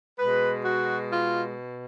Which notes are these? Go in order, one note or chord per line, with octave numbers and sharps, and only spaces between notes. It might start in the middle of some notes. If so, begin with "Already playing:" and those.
B2 G#3 B4
F#4
F4